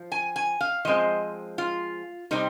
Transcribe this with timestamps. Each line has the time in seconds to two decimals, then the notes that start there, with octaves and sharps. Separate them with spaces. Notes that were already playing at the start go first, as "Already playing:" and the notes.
Already playing: F3
0.12 G#5
0.36 G#5
0.61 F5
0.85 F3 G#3 C4 D#5
1.58 F4
2.31 C3 G3 C4 D#4